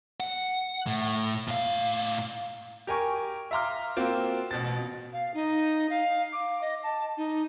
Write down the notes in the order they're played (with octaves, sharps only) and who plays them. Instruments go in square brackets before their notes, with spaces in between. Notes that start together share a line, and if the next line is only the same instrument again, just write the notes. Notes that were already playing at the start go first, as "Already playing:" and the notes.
[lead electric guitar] F#5
A2
A2 F5
[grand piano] G4 A#4 G#5 C#6
E5 F5 A#5 C6 D6 F6
A#3 C4 F4 F#4
A1 B2 A6
[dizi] F5
D#4
F5
D6
D#5
A5
D#4